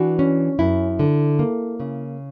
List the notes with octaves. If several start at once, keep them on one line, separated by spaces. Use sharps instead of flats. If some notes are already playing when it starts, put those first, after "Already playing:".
Already playing: E3 D4 F#4
C#4
F#2 E4
D3
A#3
C#3